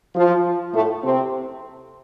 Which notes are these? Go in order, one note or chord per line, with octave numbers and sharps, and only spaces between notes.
F3 F4
A2 A3
C3 C4